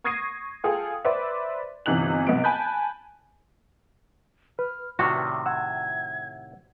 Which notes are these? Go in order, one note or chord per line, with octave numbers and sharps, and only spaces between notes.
C#6 D#6 G#6 A#6 C7 D#7
F4 G#4 A4 F5 G5
B4 C5 D5 E5 D6
G1 C3 E3 D#4 F#6 F#7
B1 C3 B3 D7
G#5 A5 B5 F#6 G6
B4 F6
A2 C3 D#3 F#4 D5
F#5 E6 G#6